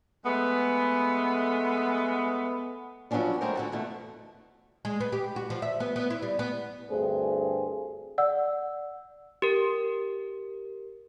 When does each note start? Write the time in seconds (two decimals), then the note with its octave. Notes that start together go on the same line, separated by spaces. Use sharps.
0.25 G#3 A3 B3
3.11 F3 F#3 G#3 B3 C#4 D4
3.41 G#3 A3 C4 F#4 A#4 C5
3.55 D3 F#4 A4
3.72 E2 B2 A3
4.85 G#3
5.00 B3
5.12 G4
5.36 F#4
5.50 F3
5.62 E5
5.80 B3
5.96 B3
6.10 E4
6.22 G3
6.39 B3
6.89 D2 G2 A3 C4 G#4
8.18 D5 F#5 E6
9.42 G4 A#4